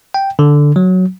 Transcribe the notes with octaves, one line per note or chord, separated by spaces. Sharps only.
G5
D3
F#3